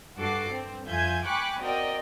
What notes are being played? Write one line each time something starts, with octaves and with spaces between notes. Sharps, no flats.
G2 F#4 A4 D6 C7
C4
F2 F4 E5 G#5 G6 G#6
G5 G#5 B5 C#6 D6 F#6
C4 F#4 A#4 D5 D#5 G5